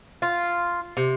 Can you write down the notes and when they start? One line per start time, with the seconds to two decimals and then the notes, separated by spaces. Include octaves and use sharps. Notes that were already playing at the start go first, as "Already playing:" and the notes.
0.22 F4
0.97 C3